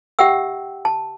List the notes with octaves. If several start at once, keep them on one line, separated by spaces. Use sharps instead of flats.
G4 E5 F#5 G5 E6
A5